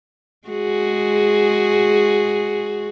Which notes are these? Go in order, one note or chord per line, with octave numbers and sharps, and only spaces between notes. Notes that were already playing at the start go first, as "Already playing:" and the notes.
G#3 F#4 G#4